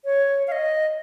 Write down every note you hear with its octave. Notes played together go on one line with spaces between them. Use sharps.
C#5
F5
D#5